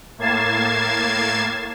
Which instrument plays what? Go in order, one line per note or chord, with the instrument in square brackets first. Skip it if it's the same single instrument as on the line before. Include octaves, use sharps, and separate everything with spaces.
[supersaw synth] A2 A#3 G#6 A6 C7 E7